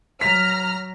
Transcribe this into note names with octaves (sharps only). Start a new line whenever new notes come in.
F#3 A#5 F6 B6